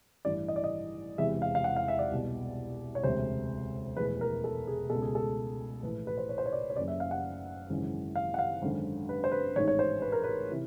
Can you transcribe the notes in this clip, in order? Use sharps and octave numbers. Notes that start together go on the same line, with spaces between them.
A1 G2 E3 D5
D#5
D5
D#5
E1 E2 C3 E3 E5
F5
F5
F#5
F5
E5
D5
C2 B2
C#5
E1 D2 C3 C5
F1 E2 B2 B4
A#4
A4
G#4
C#2 B2 A4
G#4
A4
A#1 A2 E3 B4
B4
C5
C#5
C5
C#5
D5
C#5
F#1 F#2 C#3 D5
E5
F5
F#5
G#1 F#2 C#3 E3
F5
F#5
F5
G#1 F#2 D3
B4
C5
B4
A1 G#2 D#3 C#5
C#5
C5
B4
A#4
B4
C3 E3